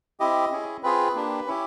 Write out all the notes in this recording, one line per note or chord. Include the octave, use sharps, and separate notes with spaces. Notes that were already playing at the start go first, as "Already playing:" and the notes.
C4 E4 G4 D#5
C#4 E4 G#4
C4 F4 G#4 B4
A#3 D4 G4
C#4 E4 G4